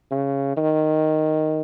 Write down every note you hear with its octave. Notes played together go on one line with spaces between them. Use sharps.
C#3
D#3